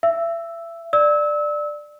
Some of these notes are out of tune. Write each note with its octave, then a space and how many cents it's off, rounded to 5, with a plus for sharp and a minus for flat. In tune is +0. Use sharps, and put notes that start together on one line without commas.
E5 +30 E6 +0
D5 +15 E6 -30